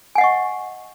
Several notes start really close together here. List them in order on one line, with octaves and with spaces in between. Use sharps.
G#5 F#5 D#5 C#6